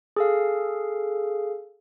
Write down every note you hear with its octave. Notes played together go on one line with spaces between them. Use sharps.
G#4 A4 F5